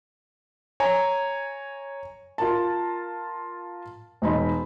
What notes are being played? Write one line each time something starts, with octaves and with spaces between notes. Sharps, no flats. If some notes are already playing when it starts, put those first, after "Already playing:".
C#5 G#5 A#5
F4 A#4 A5
E1 D#4 B5